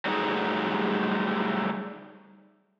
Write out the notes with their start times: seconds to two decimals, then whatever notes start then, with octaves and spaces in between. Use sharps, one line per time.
0.05 F#3 G3 A3 D#4 G#4